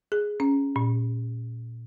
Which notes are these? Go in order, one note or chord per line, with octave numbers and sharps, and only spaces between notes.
G#4
C#4
A#2